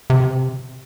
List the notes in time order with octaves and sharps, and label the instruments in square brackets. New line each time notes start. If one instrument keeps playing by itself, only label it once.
[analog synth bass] C3